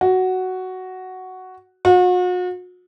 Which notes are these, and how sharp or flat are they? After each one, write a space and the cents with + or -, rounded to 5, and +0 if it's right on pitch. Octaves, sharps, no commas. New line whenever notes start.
F#4 +5
F#4 -40